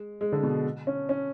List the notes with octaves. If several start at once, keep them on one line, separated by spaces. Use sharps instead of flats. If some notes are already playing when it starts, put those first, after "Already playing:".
Already playing: G#3
G#3
D3
B2
C#4
C#4